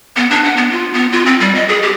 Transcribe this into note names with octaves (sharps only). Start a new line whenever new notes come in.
B3
D4
F#5
B3
F4
B3
F4
C4
G3
D#5
G#4
G4